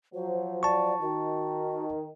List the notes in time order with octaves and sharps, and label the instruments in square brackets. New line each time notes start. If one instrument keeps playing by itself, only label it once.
[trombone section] F3 F#3 [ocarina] C5
[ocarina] D5 [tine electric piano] A5 C#6
[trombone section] D#3 [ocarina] F#4